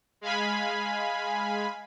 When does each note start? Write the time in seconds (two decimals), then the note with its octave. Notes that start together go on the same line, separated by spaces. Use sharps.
0.21 G#3 F5 G#5 B5